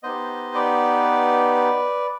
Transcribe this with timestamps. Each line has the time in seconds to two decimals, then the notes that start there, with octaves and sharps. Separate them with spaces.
0.03 B3 D#4 G4 C5 D#5
0.54 B4 D5